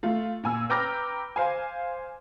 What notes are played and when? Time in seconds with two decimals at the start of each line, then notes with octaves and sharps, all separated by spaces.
0.03 A3 F4
0.44 A#2 G#5 E6
0.70 B4 G5 A#5 D6 F6 A#6
1.36 C5 F5 G#5